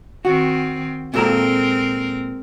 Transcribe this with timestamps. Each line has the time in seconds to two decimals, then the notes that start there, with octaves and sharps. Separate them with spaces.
0.25 D#3 C4 F#4
1.14 A#2 G#3 C4 A4 A#4 A#5